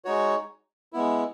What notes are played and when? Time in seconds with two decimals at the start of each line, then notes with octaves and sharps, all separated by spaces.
0.05 G#3 D#4 F#4 C#5
0.93 G#3 B3 E4